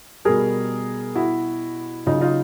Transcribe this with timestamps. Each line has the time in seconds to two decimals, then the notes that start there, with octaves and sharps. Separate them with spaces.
0.25 B2 G3 G#4 A#4
1.16 E4 F#4
2.06 C#3 F#3 D#4 F4
2.21 D#4 F4